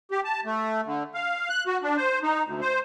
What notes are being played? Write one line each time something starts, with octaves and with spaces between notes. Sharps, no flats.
G4
A5
A3
D3
F5
F#6
F#4
D4
C5
D#4
D2
C5